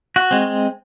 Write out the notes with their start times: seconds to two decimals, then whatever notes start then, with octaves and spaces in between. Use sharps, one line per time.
0.16 F#4
0.31 G#3 C4